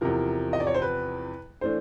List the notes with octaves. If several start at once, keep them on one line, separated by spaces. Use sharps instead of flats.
E2 C3 F3 A#4
D#5
D5
C#5
C5
B4
E3 A3 D4 C5